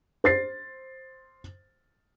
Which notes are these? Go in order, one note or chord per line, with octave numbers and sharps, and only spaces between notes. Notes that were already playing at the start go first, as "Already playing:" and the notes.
C5 A6 C7